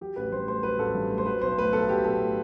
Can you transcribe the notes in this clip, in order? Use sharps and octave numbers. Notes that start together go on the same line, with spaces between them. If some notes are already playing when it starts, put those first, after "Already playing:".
F#3 G4
A1 B4
G2 C5
A3 C5
F#3 B4
A1 A4
G2
A3
C5
F#3 B4
B1 C5
A2 B4
B1 A4
F#3 G4
B1 A4
A2